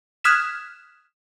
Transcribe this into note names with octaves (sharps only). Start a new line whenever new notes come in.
D#6 F6 F#6 G#6 B6 E7